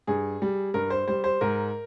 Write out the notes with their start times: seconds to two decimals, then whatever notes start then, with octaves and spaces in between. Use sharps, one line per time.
0.07 G2 G#4
0.42 G3
0.74 G2 A#4
0.90 C5
1.08 G3 C5
1.24 C5
1.41 G#2 A#4